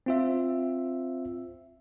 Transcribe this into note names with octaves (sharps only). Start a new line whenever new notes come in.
C4 F4 E5